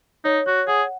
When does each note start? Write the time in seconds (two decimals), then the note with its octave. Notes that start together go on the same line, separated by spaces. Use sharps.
0.25 D#4 C#5
0.46 F#4 C#5
0.67 G#4 F#5